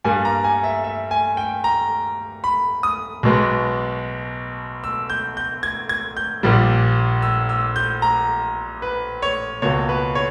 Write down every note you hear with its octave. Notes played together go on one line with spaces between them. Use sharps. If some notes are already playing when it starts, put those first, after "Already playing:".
G2 G3 A#3 G#5
A#5
G#5
E5
E5
G#5
G5
A#5
B5
D#6
B1 B2 G#3 B3
E6
G6
G6
G#6
G#6
G6
A#1 A#2 G3
E6
E6
G6
A#5
B4
C#5
C#2 B2 A#3 C#5
B4
C#5